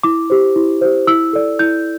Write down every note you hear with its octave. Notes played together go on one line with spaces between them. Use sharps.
E4 D6
G4 C5
E4
G4 C5
E4 E6
A4 D5
E4 G6